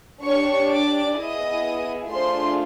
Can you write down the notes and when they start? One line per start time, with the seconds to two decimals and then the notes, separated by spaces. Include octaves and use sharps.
0.24 D4 G4 C#5 C#6
0.72 D5 D6
1.18 B3 E4 G#4 D#5 D#6
2.12 A3 D4 F4 G#4 C5 C6